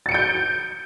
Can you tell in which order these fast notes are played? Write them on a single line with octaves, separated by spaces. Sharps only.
A6 C#7 D7 G6